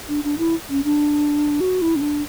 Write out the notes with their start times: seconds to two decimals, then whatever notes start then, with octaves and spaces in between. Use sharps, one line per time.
0.09 D4
0.24 D4
0.38 E4
0.70 C#4
0.84 D4
1.61 F#4
1.82 E4
1.96 C#4
2.01 D4